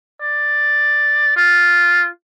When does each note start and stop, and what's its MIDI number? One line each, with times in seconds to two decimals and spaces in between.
0.22 1.35 74
1.36 2.08 65